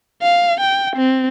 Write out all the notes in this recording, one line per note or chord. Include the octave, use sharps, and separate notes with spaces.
F5
G5
C4